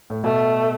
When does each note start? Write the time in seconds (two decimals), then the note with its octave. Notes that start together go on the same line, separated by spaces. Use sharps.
0.10 A2
0.23 B2 A3